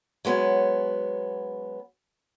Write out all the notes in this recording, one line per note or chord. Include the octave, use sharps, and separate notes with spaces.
F#3 G#3 B3 C#4